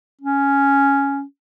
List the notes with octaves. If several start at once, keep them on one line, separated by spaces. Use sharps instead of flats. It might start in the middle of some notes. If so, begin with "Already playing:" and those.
C#4